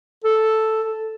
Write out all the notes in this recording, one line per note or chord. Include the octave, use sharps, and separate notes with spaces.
A4